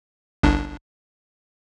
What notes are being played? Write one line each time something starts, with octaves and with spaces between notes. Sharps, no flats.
G1 C2 D4